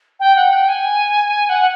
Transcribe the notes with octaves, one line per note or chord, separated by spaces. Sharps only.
G5
F#5
G5
G#5
F#5